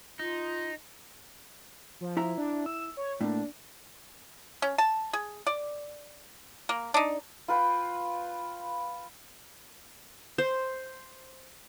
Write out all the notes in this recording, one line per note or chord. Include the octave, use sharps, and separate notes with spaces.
D#4 F4
F3
E4 E5 A#5
D4
E6
C#5
A2 A#3 D4
C#4
A5
G#4
D5
A#3
D4 D#4
F4 B4 G5
C5